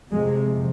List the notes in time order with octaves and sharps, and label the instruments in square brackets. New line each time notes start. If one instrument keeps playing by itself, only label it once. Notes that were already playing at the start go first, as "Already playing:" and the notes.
[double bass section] F2 C3 G#3